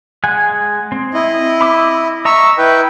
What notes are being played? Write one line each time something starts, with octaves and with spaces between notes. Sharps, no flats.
G#3 F#5 G#5
C4
E4 D#5
B5 D6 E6
D#5 E5 A#5 C#6 E6
E4 B4 G5